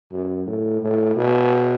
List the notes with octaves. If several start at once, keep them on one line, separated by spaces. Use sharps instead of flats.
F#2
A2
A2
B2